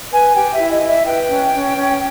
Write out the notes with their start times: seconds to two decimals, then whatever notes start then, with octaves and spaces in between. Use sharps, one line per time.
0.11 B4 G#5
0.34 G4 G5
0.53 E5
0.58 E4
0.70 D#5
0.82 E4
0.88 E5
1.05 B4 G5
1.30 C#4
1.53 C#4
1.76 C#4